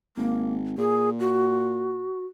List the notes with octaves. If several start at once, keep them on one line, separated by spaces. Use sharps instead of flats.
G#1 A#3
A#2 G#4
F#4